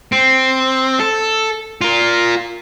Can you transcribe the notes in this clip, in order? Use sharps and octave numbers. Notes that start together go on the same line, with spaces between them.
C4
A4
F4 A#4